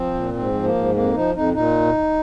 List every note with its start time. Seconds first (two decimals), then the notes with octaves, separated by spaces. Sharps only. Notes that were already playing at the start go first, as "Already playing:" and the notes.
Already playing: F3 C4
0.14 A#2
0.34 G#2 C4
0.54 F3
0.63 A#3
0.74 G#2
0.94 F2 A#3
1.14 F3 D#4
1.34 F2 D#4
1.53 A#2 D#4